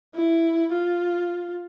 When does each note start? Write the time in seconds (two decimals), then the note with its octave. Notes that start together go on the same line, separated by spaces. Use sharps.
0.15 E4
0.73 F4